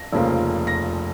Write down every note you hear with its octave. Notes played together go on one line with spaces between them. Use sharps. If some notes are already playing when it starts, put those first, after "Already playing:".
Already playing: A#6
F1 F2 C#3 F3 A#3
A#6